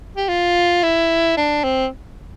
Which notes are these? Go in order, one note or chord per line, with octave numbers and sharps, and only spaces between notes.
G4
F4
E4
D4
C4